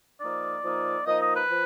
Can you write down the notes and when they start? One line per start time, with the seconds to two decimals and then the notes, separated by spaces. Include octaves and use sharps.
0.21 F3 A#3 D#4 D5
0.64 F3 A#3 D#4
1.07 F3 A#3 D#4 D#5
1.21 D#5
1.35 B4
1.50 F3